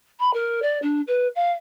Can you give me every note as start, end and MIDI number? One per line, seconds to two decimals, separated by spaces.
0.20 0.31 83
0.34 0.60 70
0.62 0.79 74
0.82 1.01 62
1.07 1.28 71
1.36 1.52 77